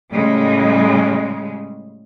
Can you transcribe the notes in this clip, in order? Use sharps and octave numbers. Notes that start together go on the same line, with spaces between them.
A2 C#3 G3 G#3